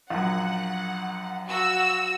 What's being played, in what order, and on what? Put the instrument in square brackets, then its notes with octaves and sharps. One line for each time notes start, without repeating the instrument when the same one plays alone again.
[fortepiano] A#1 F#2 [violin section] F#5
[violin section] F#4 E6